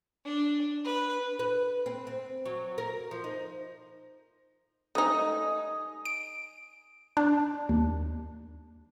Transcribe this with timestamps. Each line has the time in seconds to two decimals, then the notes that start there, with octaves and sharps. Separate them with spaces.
0.25 D4
0.85 B4
1.39 B4
1.86 C4
2.07 C4
2.46 F#3
2.78 A#4
3.11 F3
3.24 D#4
4.95 A3 D#4 D#5 G#5
6.05 D7
7.17 D4
7.69 D#2